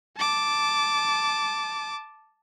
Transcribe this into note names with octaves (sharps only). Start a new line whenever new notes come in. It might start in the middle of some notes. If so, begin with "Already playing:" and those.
A5 D6